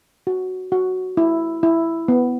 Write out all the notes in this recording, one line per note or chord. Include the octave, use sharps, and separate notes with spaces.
F#4
F#4
E4
E4
B3